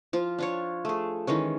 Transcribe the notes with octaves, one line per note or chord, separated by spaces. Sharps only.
F3 F4
D4 F4 C#5
A3 G#4
D#3 E3 G#3 C#4